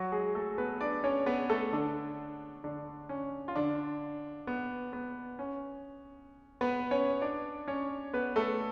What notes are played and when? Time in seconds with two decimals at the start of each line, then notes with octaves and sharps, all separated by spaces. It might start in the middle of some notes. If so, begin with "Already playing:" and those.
Already playing: F#3 F#4
0.12 G#3 G#4
0.35 A3 A4
0.58 B3 B4
0.81 D4 D5
1.04 C#4 C#5
1.26 B3 B4
1.50 A3 A4
1.73 D3 D4
2.64 D3 D4
3.09 C#4
3.48 F4
3.56 D3 D4
4.47 B3
4.93 B3
5.39 C#4
6.61 B3 B4
6.91 C#4 C#5
7.22 D4 D5
7.68 C#4 C#5
8.13 B3 B4
8.36 A3 A4